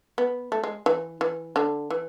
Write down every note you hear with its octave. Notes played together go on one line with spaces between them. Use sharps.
B3
A3
G#3
E3
E3
D3
E3